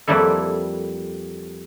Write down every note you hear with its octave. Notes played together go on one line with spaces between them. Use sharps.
F2 G3 A#3 E4 A4